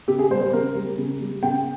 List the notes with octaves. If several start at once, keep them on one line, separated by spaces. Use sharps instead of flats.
C#3 G4
G#4
G3 C5
C5
C#3 A#4
G3
C#3
G3
C#3 G5